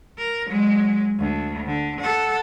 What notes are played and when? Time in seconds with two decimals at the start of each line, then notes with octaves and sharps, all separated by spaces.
0.18 A#4
0.49 F#3 G#3
1.19 D2
1.66 D3
2.00 A4 F#5